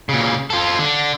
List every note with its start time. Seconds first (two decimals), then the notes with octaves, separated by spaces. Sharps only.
0.09 A#2 C#3
0.50 F4 A4
0.79 D3